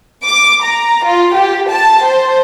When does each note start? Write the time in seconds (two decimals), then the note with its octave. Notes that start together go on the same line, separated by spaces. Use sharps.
0.24 D6
0.62 A#5
1.04 F4
1.35 G4
1.69 A5
2.03 C5